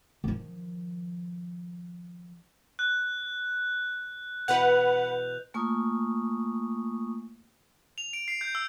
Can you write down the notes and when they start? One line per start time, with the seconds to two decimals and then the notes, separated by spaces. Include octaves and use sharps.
0.24 D#3 F3
2.79 F#6
4.48 B2 E3 B4 C#5 F#5 G6 F7
5.54 A3 A#3 F4 G#5 C#6 D#6
7.98 F7
8.13 D7
8.28 C7
8.41 G6
8.55 E6